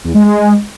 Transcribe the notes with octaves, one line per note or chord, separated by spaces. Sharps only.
E2
G#3
G#3